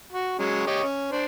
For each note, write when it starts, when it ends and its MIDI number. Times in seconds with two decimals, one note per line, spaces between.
0.12 0.36 66
0.39 0.65 54
0.39 0.65 56
0.39 0.65 61
0.67 0.83 67
0.67 0.83 73
0.67 0.83 75
0.83 1.07 61
1.12 1.25 62
1.12 1.25 72
1.12 1.25 74